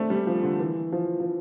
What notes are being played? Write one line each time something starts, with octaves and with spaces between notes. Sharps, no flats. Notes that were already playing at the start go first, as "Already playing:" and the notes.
Already playing: A3 C4 D4
G3
F3
D3
E3
F3
F3